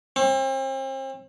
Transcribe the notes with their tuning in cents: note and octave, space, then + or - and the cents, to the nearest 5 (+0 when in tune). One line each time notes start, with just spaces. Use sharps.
C4 +40